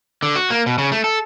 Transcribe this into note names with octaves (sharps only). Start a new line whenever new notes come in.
D3
F#4
A#3
B2
C#3
A3
A4